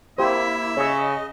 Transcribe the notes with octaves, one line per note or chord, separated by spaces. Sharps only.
A#3 E4 G4 C5 E5
C#3 C#5 D#5 E6